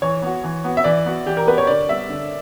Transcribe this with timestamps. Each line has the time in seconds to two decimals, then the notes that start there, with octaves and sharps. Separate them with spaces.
0.02 E3 C#5
0.22 B3 F#4
0.44 E3
0.64 B3 F#4
0.77 E5
0.84 E3 D5
1.06 B3 F#4
1.26 E3 G4
1.37 A#4
1.47 B3 F#4 B4
1.58 C#5
1.67 D3 D5
1.89 G3 B3 E5
2.09 D3